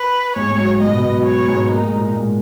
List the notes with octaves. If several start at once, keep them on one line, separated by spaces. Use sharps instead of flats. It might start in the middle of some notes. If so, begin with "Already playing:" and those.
Already playing: B4
G#2 G#3 C#5
G#3
F#3
G#2 G#3 D#5
B2 B3
B2 B3
F#3
C#5
G#2 G#3
A#3 D#4
G#3
A#2 A#3
G#2 G#3